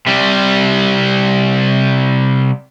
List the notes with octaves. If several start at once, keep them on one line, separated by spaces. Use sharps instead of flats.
C3 G3